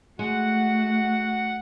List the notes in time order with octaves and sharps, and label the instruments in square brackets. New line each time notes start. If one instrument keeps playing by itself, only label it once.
[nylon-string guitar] G#3 [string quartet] A3 [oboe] F#4 [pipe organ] F#5